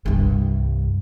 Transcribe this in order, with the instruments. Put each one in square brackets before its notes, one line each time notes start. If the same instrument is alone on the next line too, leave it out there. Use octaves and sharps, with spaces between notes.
[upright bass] C2 G2